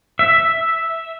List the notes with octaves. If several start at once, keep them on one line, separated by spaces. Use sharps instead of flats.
E5